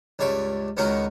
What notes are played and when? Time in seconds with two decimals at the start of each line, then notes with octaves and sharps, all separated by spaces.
0.19 C#2 G2 C#5 D5 E5
0.77 C#2 D#3 B3 C#4 F#4 A#4